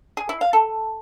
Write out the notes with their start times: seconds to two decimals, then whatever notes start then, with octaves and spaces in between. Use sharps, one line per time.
0.17 G#4
0.29 E4
0.41 F5
0.53 A4